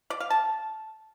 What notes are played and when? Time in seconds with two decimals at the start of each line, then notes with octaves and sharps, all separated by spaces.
0.10 D5
0.20 F5
0.30 A5